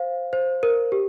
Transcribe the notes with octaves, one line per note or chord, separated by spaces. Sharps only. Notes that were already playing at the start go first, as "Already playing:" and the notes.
Already playing: C5 F5
C5
A#4
G4